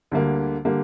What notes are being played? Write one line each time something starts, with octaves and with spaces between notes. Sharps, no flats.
D2 D3 G3 A#3
D3 G3 A#3